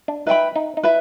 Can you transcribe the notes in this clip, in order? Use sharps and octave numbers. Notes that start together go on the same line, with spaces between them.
D4
D#4 B4 E5 G5 B5
D#4
D#4
E4 B4 E5